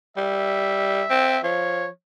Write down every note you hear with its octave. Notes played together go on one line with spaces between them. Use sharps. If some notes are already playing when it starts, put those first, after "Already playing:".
G3 E5
C4
F3 C#5